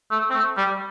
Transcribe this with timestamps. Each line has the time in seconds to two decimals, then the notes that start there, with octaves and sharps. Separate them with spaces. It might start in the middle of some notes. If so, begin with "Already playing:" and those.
0.11 A3
0.30 C4
0.34 A3
0.57 G3